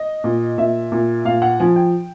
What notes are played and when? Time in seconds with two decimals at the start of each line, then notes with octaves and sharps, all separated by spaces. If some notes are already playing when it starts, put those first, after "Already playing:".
Already playing: D#5
0.24 A#2
0.58 A#2 E5
0.92 A#2
1.25 A#2 F5
1.42 F#5
1.60 F3 G#5
1.76 G5